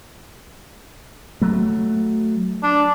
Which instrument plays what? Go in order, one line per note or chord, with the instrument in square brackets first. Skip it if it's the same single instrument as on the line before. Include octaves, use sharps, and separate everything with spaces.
[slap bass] F#3 A3
[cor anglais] D4